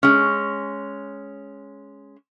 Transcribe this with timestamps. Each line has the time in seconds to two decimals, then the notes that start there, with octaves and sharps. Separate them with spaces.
0.03 G#3 C#4